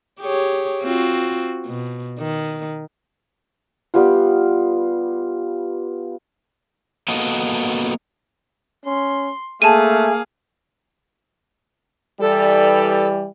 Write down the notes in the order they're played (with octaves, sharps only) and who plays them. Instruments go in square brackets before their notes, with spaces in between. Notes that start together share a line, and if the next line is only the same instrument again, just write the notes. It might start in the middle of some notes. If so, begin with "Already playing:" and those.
[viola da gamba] G4 G#4 C#5
C4 F4 F#4
B2
D#3
[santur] G3 B3 F4
[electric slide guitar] A#3 B3 F#4 A4 D#5
[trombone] C#4 [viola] C6
[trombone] A3 [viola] A#3 F5 [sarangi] G#4 [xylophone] A5 D#7
[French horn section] E3 G3 [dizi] A4